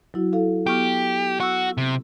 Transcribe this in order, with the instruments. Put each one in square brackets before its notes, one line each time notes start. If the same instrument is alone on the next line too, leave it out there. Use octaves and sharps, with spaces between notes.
[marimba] F#3 E4 F#4
E4 A4 F5
[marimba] B3 C#6 F6 [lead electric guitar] G4
[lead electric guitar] F#4 [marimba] C#6 E6
[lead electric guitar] C3